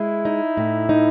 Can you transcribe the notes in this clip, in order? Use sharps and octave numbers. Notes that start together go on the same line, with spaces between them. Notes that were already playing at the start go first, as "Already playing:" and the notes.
Already playing: G#3 E4
D#4
A2
D#4